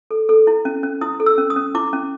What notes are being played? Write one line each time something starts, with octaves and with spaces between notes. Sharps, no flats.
A4
A4
E4
C#4
C#4
E4 D#6
A4
E6
C#4
D#6
C#4
E4 D6
C#4